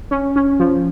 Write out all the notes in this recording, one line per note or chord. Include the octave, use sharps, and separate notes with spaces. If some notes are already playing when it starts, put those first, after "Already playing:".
C#4
C#4
F3